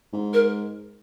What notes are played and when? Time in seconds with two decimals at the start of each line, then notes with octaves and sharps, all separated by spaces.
0.12 G#2
0.34 A#4